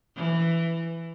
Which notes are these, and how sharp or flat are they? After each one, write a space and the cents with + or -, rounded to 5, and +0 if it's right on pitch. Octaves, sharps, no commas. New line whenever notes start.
E3 +10